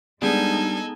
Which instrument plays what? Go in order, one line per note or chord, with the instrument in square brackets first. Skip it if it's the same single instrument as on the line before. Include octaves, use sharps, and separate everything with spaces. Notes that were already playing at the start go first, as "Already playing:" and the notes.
[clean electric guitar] G3 D4 [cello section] G#3 D#4 [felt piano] B3 G#4 [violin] A4 G#5